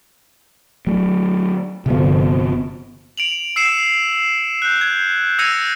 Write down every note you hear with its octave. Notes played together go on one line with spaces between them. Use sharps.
F#3 A3
G1 C3 F3 B3
D7 F7 F#7
E6 C7 C#7 E7
F#6 G6
G#6
E6 G#6 A#6 C#7 D#7 F7